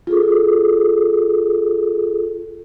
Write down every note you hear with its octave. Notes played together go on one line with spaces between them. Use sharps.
F4 G#4 A4